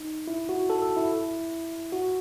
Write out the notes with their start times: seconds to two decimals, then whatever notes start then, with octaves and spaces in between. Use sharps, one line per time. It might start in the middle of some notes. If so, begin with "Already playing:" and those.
Already playing: D#4
0.28 E4
0.49 F#4
0.70 A4
0.82 A4
0.97 E4
1.92 F#4